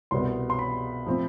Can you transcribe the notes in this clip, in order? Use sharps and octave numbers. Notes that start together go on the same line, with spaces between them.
C2 B2 B3 C6
C6
B5
A2 F3 C4